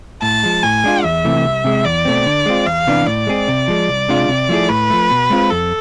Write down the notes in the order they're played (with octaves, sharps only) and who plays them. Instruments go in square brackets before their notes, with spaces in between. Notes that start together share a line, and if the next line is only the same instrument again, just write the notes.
[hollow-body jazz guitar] A2 [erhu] A5
[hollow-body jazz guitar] F3 G#3
[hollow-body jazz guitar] A2 [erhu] G#5
[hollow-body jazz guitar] G#3 D4 F4
[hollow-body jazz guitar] E2 [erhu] E5
[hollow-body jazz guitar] C3 E3 A3
C2
C3 G#3
[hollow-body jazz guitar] E2 [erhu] D5
[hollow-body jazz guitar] B2 A3 C4
D3
G#3 C4 F4
[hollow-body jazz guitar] E2 [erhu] F5
[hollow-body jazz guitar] C3 E3 B3 D4
[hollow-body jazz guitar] A2 [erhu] D5
[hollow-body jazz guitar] G#3 C4 G#4
C3
F3 G#3
C2
C3 G#3 D4 F4
C3
F3 A3 E4 G#4
[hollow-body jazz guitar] A2 [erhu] B4
[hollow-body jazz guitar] F3 A3
B2
G#3 C4 F4
[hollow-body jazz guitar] F2 [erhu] A4